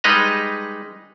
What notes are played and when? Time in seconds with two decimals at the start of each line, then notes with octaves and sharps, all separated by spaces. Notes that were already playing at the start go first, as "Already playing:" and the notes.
0.04 G3 G#3 D#4 B4 D#5 A#5